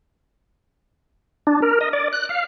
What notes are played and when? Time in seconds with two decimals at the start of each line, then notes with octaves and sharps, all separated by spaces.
1.47 D4
1.62 A#4
1.81 D#5
1.93 D5
2.13 F#6
2.29 F5